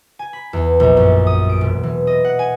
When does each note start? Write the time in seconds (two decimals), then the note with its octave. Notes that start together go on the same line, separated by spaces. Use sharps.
0.19 G#5
0.33 B5
0.53 E2
0.80 A#1
0.97 F#2
1.27 D#6
1.50 D7
1.61 E1
1.83 E3
2.07 D#5
2.25 F#5
2.39 G#5